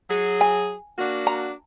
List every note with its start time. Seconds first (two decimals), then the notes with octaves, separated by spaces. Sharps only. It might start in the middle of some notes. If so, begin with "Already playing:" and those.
0.10 F#3 G#4
0.41 G#5
0.98 A#3 D4 F#4
1.27 A#5